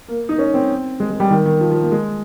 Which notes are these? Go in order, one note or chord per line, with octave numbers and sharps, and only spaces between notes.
A#3
D#4
C#4
C4
G#3
G#3
G3
D#3
D#3
F3
F3
A#3
G#3